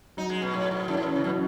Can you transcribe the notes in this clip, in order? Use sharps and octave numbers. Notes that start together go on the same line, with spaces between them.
F#3 D#4
G#3
B2
A2 F#3
G#2
F#2 E3
G#2
A2
C#3
B2 F#3